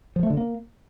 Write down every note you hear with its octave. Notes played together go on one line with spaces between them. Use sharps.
F3
A3
D3
A#3